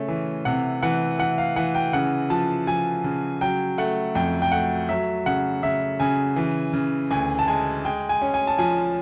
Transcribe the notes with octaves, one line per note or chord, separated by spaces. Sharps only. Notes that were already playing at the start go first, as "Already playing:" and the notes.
Already playing: C#3 A3 C#4
E3
C3 F#5
E3 F#5
E3 F#5
F5
E3 F#5
G5
C#3 F#5
F3 A5
F3 G#5
C#3
F#3 G5
A3 F#5
F2 G5
G5
A3 F#5
F#3 E5
C#3 F#5
C#3 E5
C#3 G#5
E3
C#3
D2 G#5
A5
G#3 G#5
G#3 G5
G#5
C#4
G#5
A5
F3 G#5